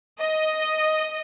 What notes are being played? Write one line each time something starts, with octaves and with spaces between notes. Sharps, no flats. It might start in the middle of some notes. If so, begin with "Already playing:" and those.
D#5